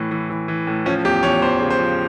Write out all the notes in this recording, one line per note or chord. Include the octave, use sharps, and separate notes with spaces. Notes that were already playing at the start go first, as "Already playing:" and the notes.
Already playing: A2 E3
E3
E3
E3
A2
F3 C#4
E2 G4
E2 C#5
E2 C5
C#3
C5
F3